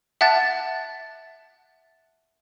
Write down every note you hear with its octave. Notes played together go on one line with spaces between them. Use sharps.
E5 F#5 A5 F#6 A6